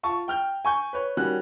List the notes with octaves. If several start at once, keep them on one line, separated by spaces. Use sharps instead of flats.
F4 A5 C#6
G5 F6 G6
G#5 C#6 G6
B4 C#5
D#3 G3 C#4 F#4 F#6